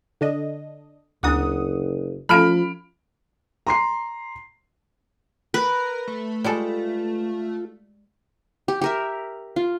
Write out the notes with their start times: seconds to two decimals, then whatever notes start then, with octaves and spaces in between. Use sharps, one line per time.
0.21 D3 D4 D#5
1.23 F#1 D2 B3 D4 F#5 D6 D#6
2.29 F3 A3 C#4 F5 A5 B5 F6 D7
3.67 A#5 C6 C7
5.54 A#4 B4 A#5
6.07 A3
6.44 G3 G#3 F4 A4
8.68 G4
8.81 G4 A#4 E5
9.56 F4